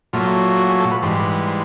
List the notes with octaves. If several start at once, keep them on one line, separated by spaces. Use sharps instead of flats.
A#2 F#3 A3 F4
F#4
G#4
A4
B4
G#2 E3 G3 C5
C5